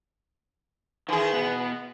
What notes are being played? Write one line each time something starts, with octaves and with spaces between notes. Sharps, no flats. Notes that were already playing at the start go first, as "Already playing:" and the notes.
D#3 E3 G#4
B2 B3